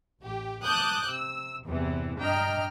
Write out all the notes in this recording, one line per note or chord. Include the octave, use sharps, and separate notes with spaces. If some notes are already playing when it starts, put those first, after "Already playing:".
A1 G4
A5 D6 D#6 F#6 G6
C3 E6
E2 G2 C3 E3
G2 D4 D#5 G5 A#5 F6